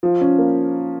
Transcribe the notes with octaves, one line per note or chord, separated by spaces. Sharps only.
F3
C#4
A#3